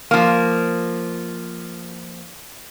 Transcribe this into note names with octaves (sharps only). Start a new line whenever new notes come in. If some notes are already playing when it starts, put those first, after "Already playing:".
F3 A#3